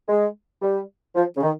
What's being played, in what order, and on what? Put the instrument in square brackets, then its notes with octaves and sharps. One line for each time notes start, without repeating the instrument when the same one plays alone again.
[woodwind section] G#3
G3
F3
C#3
D#3